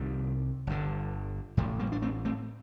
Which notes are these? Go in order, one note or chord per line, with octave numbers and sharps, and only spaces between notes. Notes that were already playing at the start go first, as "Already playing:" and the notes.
Already playing: C2 C3 D#3 G3
G1 G2 D3
A1 A2 F3 A3
G3 A#3
D4
A3 C4
A3 C4